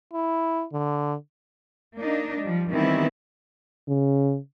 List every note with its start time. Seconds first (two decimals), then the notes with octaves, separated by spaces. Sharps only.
0.13 E4
0.73 D3
1.96 A#3 D4 D#4
2.41 F3 G3
2.72 D#3 E3 G3 B3 C4 E4
3.88 C#3